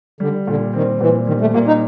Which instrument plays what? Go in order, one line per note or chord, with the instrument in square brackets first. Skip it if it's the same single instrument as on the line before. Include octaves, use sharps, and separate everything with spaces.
[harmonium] D3 [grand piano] G3
[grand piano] A#2 [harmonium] D3
[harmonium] D#3 [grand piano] C4
[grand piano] A#2 [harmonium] E3
[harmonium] D#3 [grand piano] G3
[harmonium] A3
[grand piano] A#2 [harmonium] A#3
[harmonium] D#4